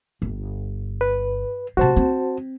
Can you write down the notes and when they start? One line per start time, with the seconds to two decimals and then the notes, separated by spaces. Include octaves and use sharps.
0.22 G1
1.01 B4
1.77 C3 G#3 F#4 C5 A5
1.96 C4